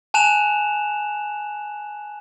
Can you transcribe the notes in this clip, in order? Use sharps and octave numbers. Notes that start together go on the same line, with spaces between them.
G#5 A5 F#6 E7 F7